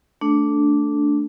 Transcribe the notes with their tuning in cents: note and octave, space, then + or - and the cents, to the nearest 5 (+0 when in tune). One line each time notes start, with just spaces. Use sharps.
A3 +5 D4 -10 A4 -10